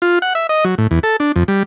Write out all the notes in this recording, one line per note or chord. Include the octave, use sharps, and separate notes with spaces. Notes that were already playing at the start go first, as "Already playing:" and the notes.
F4
F#5
E5
D#5
F#3
A2
E2
A4
D4
F2
G3